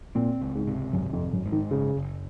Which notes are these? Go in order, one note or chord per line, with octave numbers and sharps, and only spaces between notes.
A#2 C4
C#2
G#2
C3
G#1 F#2
F2
G#1
F#2
G#2
D#3
F#1 C#3
F#1